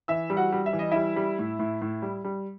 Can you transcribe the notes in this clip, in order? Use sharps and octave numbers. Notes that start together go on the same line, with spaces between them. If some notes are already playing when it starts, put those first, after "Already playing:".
E3 E5 E6
G3
F#4 F#5
G3
E5
E3
D#5
G3 E4 E5
G3
A2
A2
A2
G3
G3